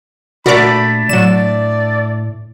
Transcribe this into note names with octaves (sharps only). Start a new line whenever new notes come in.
A#2 A3 D4 F#4 A#4 D5 B5
A2 F#3 D5 E7